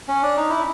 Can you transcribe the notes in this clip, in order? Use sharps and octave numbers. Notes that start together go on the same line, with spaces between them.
C#4
D4
D#4
E4